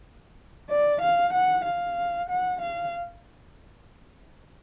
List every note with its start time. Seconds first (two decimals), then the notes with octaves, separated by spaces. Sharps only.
0.70 D5
1.01 F5
1.33 F#5
1.65 F5
2.29 F#5
2.61 F5